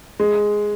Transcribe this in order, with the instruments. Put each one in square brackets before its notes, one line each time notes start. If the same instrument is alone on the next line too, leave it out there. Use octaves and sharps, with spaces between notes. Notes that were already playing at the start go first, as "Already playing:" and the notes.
[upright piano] G#3